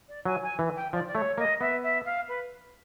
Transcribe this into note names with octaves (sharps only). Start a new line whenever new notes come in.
D5
F#3 G#5
G#5
E3
G5
F3 D5
D5
A3 C#5
A#3 D#5
B3 E5
E5
F5
B4